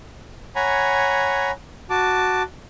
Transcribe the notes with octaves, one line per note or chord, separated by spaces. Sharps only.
C#5 F#5 G#5 A#5 B5
F#4 A5 D6